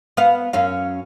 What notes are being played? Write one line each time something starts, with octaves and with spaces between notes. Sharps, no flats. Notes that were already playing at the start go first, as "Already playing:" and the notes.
B3 F5
F#2 C#4 F5